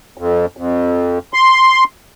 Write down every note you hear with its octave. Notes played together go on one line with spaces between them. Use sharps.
F2
F2
C6